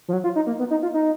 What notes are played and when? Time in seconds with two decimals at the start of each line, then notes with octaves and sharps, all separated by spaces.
0.08 F3
0.13 F#3
0.24 F4
0.36 D#4
0.47 A#3
0.59 B3
0.71 D#4
0.82 F4
0.94 D#4